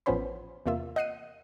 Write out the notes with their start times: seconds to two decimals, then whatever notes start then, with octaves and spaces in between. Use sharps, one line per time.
0.06 A1 F3 B3 C#4 C5 B5
0.66 E2 C3 A#3 F4 E5
0.96 D#5 F#5 F#6 C7 C#7 D#7